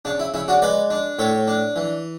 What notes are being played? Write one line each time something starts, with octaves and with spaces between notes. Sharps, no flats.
C#3 D4
E4
C#3 E4
D4 F#4
G#3 B4 D5
D4
A2 A4 C#5
D4
E3